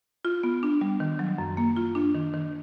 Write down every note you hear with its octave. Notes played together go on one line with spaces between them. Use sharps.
F4
B3
D4
G3
D#3
F#3
F#2
A#3
F4
D4
D#3
D#3